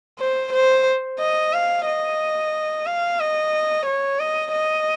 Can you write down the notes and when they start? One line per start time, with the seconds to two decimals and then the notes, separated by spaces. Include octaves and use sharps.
0.20 C5
0.53 C5
1.19 D#5
1.53 F5
1.86 D#5
2.86 F5
3.20 D#5
3.86 C#5
4.20 D#5
4.53 D#5